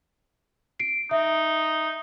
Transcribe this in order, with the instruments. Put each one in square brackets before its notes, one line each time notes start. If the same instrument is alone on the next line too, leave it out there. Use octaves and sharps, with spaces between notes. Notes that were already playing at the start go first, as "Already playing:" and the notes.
[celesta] C7 D7
[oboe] D#4 [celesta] E5